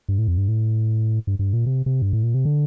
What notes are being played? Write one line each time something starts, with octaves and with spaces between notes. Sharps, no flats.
G2
A2
F2
G2
A2
G2
G2
A#2
C3
C3
G2
A2
A#2
C3
D3